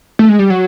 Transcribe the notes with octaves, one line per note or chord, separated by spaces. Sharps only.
A3
G#3
G3
F#3